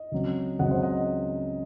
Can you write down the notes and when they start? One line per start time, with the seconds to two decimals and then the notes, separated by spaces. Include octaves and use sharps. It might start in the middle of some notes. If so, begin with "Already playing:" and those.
Already playing: D#5
0.12 C#2 C#3 F#3 C4
0.59 C#2 C#3 F#3 C4 D#5 F#5
0.71 C5 D#5
0.82 D#5 F#5